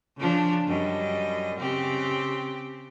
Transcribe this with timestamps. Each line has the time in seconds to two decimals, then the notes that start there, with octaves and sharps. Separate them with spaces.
0.17 C#3 F3 D4
0.67 F#2 G3 D#5
1.59 C#3 C4 G4